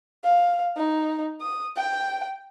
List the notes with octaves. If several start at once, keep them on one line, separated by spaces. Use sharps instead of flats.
F5
D#4
D#6
G5